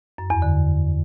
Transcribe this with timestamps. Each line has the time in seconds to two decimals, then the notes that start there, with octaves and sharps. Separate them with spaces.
0.18 F#2
0.30 E2
0.42 D3